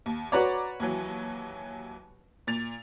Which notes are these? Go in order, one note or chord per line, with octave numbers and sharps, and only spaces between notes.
D#2
F#4 B4 C#5 D5 A#5
D#2 E3 F#3
A#2 A6 F7